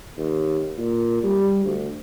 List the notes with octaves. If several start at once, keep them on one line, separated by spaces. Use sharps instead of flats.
D#2
A#2
G3
D2